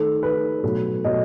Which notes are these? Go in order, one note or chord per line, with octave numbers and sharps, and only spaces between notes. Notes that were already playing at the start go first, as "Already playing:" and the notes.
Already playing: D#3 A3 A4
D#3 A3 B4
B2 F#3 A3
B2 F#3 A3 D#5